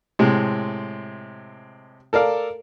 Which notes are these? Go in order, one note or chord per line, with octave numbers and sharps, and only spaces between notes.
A2 C3 G#3
A4 A#4 D5 F5